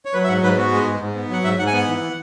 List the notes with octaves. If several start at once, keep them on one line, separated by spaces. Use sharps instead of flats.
C#5
F#3 B4
E5
G#2 F#5
G#2 B4
B3 F#4
G#3
G#2
G#2
B3
F#3 F#5
G#2 E5
G#2 F#5
G#5
B3 F#5
E3